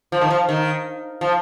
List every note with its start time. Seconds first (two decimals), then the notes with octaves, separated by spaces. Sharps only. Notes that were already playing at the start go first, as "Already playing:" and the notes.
0.12 F3
0.21 D#3
0.30 F3
0.49 D#3
1.21 F3